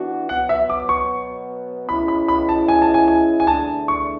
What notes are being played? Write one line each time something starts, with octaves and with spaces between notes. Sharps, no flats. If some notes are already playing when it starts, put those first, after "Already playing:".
Already playing: E3 B3 D4 F#4
B2 F#3 B3 F#5
E5
D6
C#6
B2 G#3 C#4 E4 B5
B5
B5
A5
G#5
A5
G#5
G#5
G#5
E2 D3 A3 D4 A5
C#6